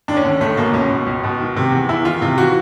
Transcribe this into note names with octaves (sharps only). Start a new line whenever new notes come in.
D#2 D4
C#4
D3
C#2 A3
B2 A#3
C#2 C#4
B2
C#2
B2
D#3
C3
E2
E2 E4
D#3 F4
C3 F4
E3 F#4